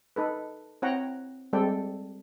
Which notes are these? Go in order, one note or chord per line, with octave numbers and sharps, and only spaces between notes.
D#4 A4 B4
C4 E4 C#5 F#5 G5 A#5
G3 G#3 C4 A4 D5 G5